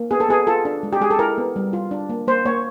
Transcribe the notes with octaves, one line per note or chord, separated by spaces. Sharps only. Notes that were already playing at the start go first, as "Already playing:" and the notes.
Already playing: A#3
B3 G#4
A4
B3 G#4
F4 A4
D4
G#3
G4
G#3 G#4
A4
E4 A#4
B3
G3
F4
D4
A#3
A#3 C5
A#3 C#5